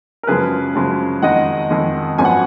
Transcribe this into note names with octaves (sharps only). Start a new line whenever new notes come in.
A#4
F#2 C#3 F3 G#3 G#4 B4
F#2 C#3 F3 G#3
F2 D#3 G#3 D#4 D#5 F#5
F2 D#3 G#3 D#4
G#1 F#2 F3 G#3 B3 G#5
F#5